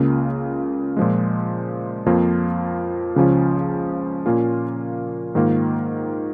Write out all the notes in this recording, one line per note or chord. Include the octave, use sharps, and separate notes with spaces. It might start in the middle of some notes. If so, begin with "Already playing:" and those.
Already playing: C#2 C#3 A#3 F4
A#2 F3 G#3
F2 F3 A#3 F4
C#2 C#3 F3 C#4 F4
A#2 A#3 C#4 F4
G#2 D#3 A#3 F4